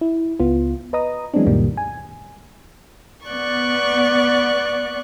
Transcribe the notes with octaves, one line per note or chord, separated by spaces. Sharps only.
E4
C#2 B3 F4
B4 D#5 A#5 D#6
E3 F#3 G#3 B3 C4 D4
C#2 F#2 A#2 D#3 G3 A#3
G#5
B3 D5 C#6 F#6